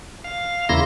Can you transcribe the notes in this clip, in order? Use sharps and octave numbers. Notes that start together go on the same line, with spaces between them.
F5
E2 C#3 A#3 E4 C6 A#6